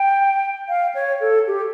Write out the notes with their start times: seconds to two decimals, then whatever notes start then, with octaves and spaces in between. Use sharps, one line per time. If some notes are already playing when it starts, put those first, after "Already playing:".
Already playing: G5
0.69 F5
0.95 C#5
1.21 A4
1.47 G4